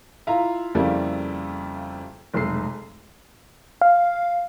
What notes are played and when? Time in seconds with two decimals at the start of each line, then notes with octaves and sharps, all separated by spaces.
0.27 E4 F4 F5 A#5
0.75 F2 C#3 G3 A3 A#3 E4
2.34 F1 B1 G#3 A4 C7
3.81 F5